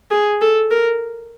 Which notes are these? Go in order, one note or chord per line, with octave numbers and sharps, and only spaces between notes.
G#4
A4
A#4